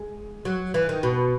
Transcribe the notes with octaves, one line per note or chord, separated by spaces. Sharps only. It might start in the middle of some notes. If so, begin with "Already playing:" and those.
Already playing: G#3
F#3
E3
D#3
B2